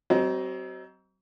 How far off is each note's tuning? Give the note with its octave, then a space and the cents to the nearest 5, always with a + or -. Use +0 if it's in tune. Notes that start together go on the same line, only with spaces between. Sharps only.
F#3 +40 C4 +0 D#5 +5